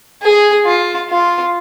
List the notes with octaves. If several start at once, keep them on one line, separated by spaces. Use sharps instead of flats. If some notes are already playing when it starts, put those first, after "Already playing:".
G#4
F4
F4